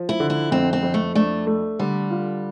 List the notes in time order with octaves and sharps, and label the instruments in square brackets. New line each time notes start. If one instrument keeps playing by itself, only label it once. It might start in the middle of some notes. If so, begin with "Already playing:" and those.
Already playing: [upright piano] F3
[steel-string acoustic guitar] E4
[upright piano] D3
[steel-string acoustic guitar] E4
[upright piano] F2 [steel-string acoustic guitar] C4
[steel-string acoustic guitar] C4
[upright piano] F2
[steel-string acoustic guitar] A3
[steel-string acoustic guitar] A3 [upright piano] D4
[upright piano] A3
[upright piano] D3 [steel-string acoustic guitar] G3
[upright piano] F4